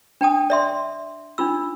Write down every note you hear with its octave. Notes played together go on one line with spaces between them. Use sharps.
D4 G5 A5 D#6
D5 E5 C6
D4 D#4 F4 E6